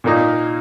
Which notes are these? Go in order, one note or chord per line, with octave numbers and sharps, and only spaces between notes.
A#2 A#3 D#4